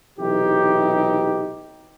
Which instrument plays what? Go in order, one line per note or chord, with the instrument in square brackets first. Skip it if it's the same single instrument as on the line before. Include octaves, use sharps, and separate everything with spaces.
[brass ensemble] B1 C3 E3 D#4 G4